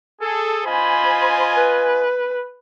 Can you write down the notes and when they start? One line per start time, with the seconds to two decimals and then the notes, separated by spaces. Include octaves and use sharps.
0.21 G#4 A4
0.66 F4 C5 D#5 G#5 B5
1.55 B4